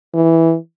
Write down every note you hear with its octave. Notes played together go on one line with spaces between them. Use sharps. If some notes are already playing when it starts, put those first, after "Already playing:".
E3